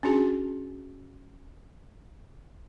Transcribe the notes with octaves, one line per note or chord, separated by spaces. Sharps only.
C#4 D4 F#4 G#4